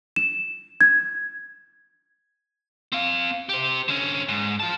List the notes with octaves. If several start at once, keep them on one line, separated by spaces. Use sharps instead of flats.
E7
G#6
C4 F5
G4 C5
D3 C#4
G#2
F4 A5